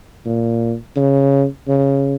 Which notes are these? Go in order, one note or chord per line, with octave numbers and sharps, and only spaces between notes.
A#2
C#3
C#3